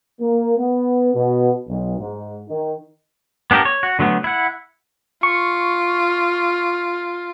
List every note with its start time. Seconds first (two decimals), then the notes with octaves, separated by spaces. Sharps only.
0.21 A#3
0.58 B3
1.14 B2
1.68 B1
1.99 G#2
2.49 D#3
3.51 B3 D4 G4 A4 A#4
3.65 C#5
3.83 F#4
3.99 D3 F#3 A3 B3
4.24 E4 F#5
5.23 F4 C#6